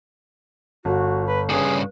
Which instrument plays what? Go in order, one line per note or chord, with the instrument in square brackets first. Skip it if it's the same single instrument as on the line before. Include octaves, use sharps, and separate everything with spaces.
[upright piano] G1 [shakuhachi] F#4
[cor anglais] B4
[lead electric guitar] G2 C#3 [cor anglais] G#4 [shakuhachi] B4